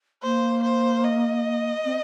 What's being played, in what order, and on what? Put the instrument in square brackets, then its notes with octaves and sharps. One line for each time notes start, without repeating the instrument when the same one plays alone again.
[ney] A#3 [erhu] C5
[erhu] C5
D#5
[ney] C4